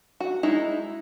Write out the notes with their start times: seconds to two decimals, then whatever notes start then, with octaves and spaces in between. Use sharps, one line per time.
0.20 F#4
0.43 G#3 D#4 E4